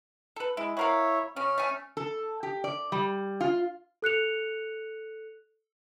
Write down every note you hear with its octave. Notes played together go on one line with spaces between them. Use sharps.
A4 B4
G#3 E4
E4 F#4 A#4 C#5 E5 F5
C#3 C#4 F6
A3 G#5
A4
G4
D5
G3
F4
A4 F#6 C#7 F7